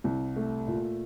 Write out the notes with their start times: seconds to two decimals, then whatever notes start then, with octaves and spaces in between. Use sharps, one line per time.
0.04 C2
0.36 A3
0.68 A#2